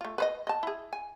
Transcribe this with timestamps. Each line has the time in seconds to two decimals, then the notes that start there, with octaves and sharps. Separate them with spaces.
0.01 A3 F4
0.18 B4 C5 D#5
0.47 D#5 A5
0.63 E4 G#4
0.93 G#5